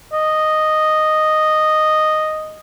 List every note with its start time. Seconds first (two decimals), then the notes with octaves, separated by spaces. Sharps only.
0.13 D#5